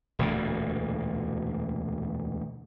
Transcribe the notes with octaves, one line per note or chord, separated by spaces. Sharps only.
E1 D2 A#2